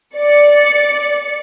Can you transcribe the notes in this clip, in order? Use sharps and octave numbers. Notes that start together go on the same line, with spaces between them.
D5 C#7